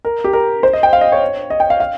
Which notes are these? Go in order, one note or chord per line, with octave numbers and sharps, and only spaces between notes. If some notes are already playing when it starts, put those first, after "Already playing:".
A#4
G4
A#4
C5
D#5
G5
F5
D#5
C#5
D#5
G5
F5
F5